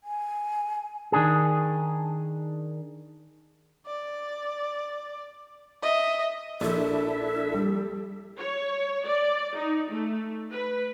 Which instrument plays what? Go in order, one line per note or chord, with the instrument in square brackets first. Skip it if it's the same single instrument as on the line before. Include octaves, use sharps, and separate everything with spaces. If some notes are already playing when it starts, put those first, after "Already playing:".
[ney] G#5
[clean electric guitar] D#3 D4 G#4
[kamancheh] D5
D#5 E5
[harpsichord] A#1 [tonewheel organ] D4 E4 E5 [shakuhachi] A4
[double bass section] G3
[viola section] C#5
D5
D#4
A3
B4